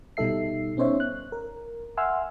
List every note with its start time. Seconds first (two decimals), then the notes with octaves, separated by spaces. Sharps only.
0.17 B2 G3 D#4 A4 E5 C7
0.77 B3 C#4 D#4 C5 C#5 E5
1.00 F#6
1.32 A#4
1.97 E5 F#5 G#5 C6 E6 F6